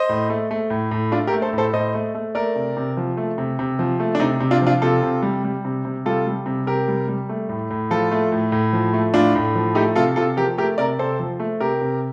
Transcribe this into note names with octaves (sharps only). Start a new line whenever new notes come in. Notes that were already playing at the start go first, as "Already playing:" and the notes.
Already playing: C5 D#5
A2
A3
A3
A2
A2
A3 D4 F4
G4 A#4
A3
A4 C5
A2
A4 C5
A2 C5 D#5
A3
A3
A3 A#4 D5
C3
C3
F3
A3
C3
C3
F3
A3
D4
C3 D#4
C3
D4 F4
F3 D4 F4
C3 F4 A4
C3
G3
G3
C3
C3
G3 F4 A4
G3
C3
C3 G4 A#4
G3
G3
A3
A2
A2
F3 F4 A4
A3
A2
A2
F3
A3
A2 D4 F4
A2
F3
A3 D#4 G4
C3 F4 A4
C3 F4 A4
F3 G4 A#4
A3 G4 A#4
C3 A#4 D5
C3 A4 C5
F3
A3
C3 G4 A#4
C3